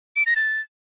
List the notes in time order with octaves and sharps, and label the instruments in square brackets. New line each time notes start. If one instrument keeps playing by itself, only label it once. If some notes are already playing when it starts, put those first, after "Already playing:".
[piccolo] D7
A#6
A6